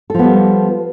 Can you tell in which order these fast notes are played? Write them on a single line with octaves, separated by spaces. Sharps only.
A4 F3 B3 G3